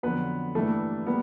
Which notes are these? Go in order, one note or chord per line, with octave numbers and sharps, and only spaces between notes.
F2 D3 F#3 B3 B4
G2 E3 G3 A3 A#3 A4
G3 A#3 B3